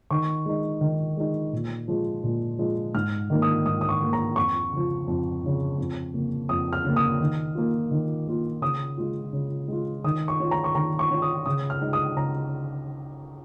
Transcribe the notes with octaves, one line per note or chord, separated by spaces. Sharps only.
D#3 C#6
G#3 D#4
D#3
G#3 D#4
A#2
F3 G#3
A#2
F3 G#3
G#2 F6
D#3 A#3
D#6
G#2 D#6
D#6
C#6
D#3 A#3
A#5
F2 C#6
C#3 F3
F2
C#3 F3
F2
C#3 A#3
F2 D#6
F6
C#3 A#3
D#6
D#3
A#3 F4
D#3
A#3 F4
C#3 D#6
G#3 F4
C#3
G#3 F4
D#3 D#6
C#6
C#4 F4
A#5
C#6
D#3 A#5
C#6
C#4 F4
D#6
C#3 D#6
F6
G#3 D#4
D#6
C#3 A#5